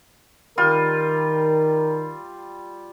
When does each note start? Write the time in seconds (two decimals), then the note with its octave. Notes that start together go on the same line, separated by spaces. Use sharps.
0.58 D#3 G3 F4 A#4